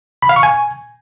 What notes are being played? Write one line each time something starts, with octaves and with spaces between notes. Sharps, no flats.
B5
F5
C#6
G#5